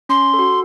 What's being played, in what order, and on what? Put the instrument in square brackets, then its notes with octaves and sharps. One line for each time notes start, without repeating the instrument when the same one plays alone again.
[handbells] C#4 [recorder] C6
[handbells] A4
F#4